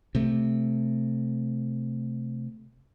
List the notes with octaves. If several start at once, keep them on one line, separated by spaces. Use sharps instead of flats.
C3 A3